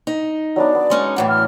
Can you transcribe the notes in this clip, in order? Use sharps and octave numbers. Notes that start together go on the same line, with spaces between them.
D#4
F#3 B3 D4 D5
B3
G#3 C#4 D#4
F#2 A2 E3 F#5
F6